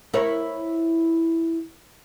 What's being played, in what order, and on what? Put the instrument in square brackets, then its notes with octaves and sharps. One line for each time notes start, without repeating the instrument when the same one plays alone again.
[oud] E4 A#4 C#5